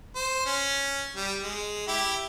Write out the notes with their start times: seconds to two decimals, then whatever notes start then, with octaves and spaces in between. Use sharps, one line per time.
0.16 C5
0.46 C#4
1.16 G3
1.43 G#3
1.87 E4 G4